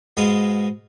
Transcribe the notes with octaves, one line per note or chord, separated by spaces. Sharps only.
G#2 B2 G#3 G#4 B4 F5